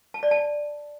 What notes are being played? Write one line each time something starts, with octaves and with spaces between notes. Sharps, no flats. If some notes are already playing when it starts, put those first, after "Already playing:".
A5
D5
A5